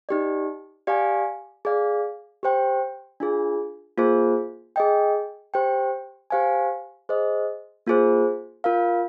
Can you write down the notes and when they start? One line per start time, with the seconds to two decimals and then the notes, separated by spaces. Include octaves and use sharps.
0.09 D#4 G4 D5
0.87 G4 D5 F5 G#5
1.65 G#4 D5 F5
2.43 G4 C5 G5
3.20 D4 F4 G#4
3.98 A#3 F4 G#4 C5
4.76 G#4 D#5 G5
5.54 G4 C5 G5
6.30 G4 C5 F5 G#5
7.09 G#4 C5 D#5
7.86 A#3 F4 G#4 C5
8.64 F4 A#4 F5